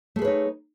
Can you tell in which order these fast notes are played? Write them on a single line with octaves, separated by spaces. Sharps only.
A3 G#4 B4 C#5 D#4